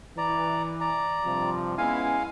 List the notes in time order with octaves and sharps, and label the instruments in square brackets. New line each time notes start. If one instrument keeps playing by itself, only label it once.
[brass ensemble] E3 [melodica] D5 A#5
[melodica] D5 A#5
[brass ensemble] G2 C3 F3
[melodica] G#3 F5 G#5 [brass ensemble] B3 C#4 E4